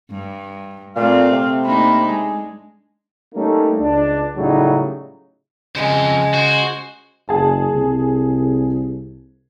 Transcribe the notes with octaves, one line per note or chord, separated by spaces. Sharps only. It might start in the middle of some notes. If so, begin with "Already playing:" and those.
G2
A#2 A3 C4 F5
C3
A#3 D4 D#4 B5
G#3 G#4
G3 A3 A#3 C#4 D#4
C#2 D4
A2 C#3 F#3 G3 D#4
F2 C#3 G#3 C5
F#4 C5
F#1 G#4 A5
C2